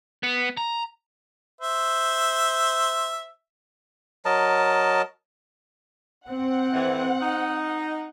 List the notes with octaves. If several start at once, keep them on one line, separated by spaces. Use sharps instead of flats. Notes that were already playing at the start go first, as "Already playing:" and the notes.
B3
A#5
C5 E5
F#3 A#4 D#5 A5
C4 F#5
F2 E3
D#4